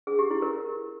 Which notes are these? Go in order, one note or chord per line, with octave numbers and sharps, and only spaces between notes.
G#4
G4
E4
A#4